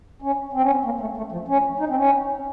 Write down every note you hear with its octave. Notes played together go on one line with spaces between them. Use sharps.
C#4
C4
C#4
C4
A#3
A3
A3
F3
C#4
D#4
C4
C#4